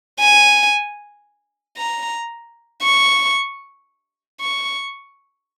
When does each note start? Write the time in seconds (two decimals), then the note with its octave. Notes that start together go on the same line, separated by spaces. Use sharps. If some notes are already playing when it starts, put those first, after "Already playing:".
0.20 G#5
1.78 A#5
2.83 C#6
4.41 C#6